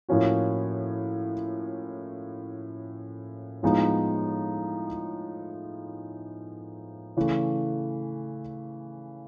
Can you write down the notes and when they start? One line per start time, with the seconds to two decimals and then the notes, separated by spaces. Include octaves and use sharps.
0.09 A2 F3 A#3 C#4 F#4
3.63 A2 F3 G#3 B3 D#4
7.17 C#3 E3 A3